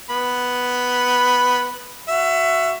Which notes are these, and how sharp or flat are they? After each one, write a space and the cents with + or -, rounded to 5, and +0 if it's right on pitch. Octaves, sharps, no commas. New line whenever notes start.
B3 +0 B5 +0
F#4 +0 E5 +20